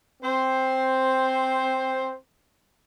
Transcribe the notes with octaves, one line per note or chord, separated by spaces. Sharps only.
C4 C5